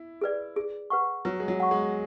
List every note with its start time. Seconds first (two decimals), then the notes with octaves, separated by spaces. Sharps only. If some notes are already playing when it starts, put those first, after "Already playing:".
Already playing: E4
0.21 G#4 B4 D5
0.56 G#4
0.90 B4 F#5 C#6
1.25 F#3 B4
1.40 G#3
1.48 F#3
1.60 F#5 C#6
1.71 G#3